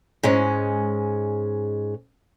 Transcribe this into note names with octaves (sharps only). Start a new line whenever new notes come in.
G#2 G#3 C#4